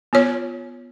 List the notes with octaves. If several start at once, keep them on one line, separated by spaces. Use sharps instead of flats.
B3 F4 C#5